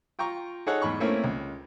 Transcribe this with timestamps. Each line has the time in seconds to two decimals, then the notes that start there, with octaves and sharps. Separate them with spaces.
0.19 F4 G5 A#5 C#6
0.67 D#4 G#4 A4 C#5 F#5
0.82 E2 G#2 B5 C#6
1.00 A3 A#3 C4 C#4 E4 C#5
1.24 C#2